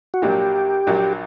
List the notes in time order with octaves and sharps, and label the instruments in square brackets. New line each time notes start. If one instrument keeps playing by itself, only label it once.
[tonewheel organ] F#4
[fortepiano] A#1 A#2 F#3 A#3 D4 [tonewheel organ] G4
[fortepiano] A#1 A#2 F#3 A#3 D4